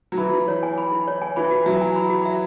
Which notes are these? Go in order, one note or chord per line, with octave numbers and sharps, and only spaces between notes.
F#3
E3 B5
E4
C#5
G#5
B5
E4
C#5
G#5
E3 B5
F#4
F#3 E5
G#5
B5
F#4
E5